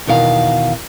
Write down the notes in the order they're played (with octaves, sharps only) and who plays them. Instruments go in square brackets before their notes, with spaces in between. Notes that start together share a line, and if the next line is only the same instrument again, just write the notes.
[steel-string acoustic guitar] E2 B2 D#3 F5 A#5